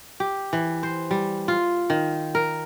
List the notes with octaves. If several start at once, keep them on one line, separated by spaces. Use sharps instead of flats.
G4
E3
C5
G3
F4
D#3
A#4